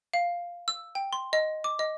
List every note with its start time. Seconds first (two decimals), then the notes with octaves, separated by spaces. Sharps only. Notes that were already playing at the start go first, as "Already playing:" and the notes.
0.14 F5
0.68 E6
0.95 G5
1.13 C6
1.33 D#5
1.64 D6
1.79 D#5